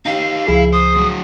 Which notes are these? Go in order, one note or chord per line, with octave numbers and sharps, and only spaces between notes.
D#4 G4 F5
C#2 F3 E4 G#4
C5 D#6
D2 F#3